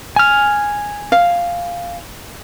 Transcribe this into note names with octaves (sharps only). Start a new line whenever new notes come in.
G#5 F6
F5